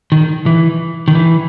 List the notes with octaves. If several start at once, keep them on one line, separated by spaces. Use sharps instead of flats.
D#3
E3
D#3
E3